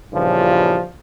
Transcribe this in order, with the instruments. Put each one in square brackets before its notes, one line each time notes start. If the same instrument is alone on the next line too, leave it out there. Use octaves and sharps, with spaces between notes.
[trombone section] G2 A#2 C#3 E3 F3 G3